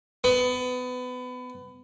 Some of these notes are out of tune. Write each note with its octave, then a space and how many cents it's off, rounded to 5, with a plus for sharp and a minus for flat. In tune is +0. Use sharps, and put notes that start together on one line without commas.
B3 +25